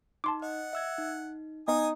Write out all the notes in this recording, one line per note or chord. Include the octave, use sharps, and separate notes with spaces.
D#4 A5 C6 D6
D#5 F#5
E5 E6 G#6
D#4
B3 D#4 G#5 D#6